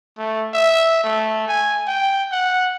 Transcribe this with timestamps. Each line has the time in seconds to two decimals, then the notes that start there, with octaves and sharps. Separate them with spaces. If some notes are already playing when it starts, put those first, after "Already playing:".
0.18 A3
0.54 E5
1.04 A3
1.48 G#5
1.87 G5
2.32 F#5